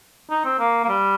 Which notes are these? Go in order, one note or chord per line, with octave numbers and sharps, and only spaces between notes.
D#4
C4
A#3
A#3
G3